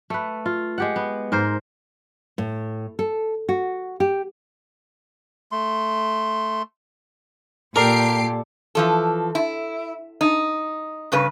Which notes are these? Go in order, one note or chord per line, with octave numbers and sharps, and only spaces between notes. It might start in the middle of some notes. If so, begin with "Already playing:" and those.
A3 B4
F4
G#3 G4 F#5
B3
G#2 A#4 C5
A2
A4
F#4
G4
A3 C6
A#2 G4 A4 A#4 D5 C7 D7
E3 F3 A4
E4
D#4
G2 C#3 B4